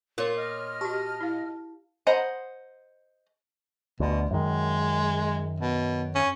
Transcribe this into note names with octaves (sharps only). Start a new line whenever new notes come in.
A#2 F4 A#4 C#5
D#5 F6
F#4 G4 A5
E4 F5
C5 D#5 F#5 A#5 B5
D2 B2
F#2 D#3 G#3
B2
C#4